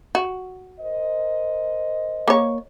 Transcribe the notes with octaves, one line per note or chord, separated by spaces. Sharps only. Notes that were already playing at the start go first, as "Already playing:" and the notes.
F#4
A#4 C5 D#5
A#3 C#5